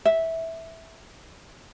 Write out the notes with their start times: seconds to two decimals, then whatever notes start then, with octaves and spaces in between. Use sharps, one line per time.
0.05 E5